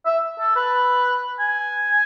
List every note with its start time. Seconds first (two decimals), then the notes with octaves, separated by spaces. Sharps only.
0.06 E5
0.39 A4
0.56 B4
1.40 G#5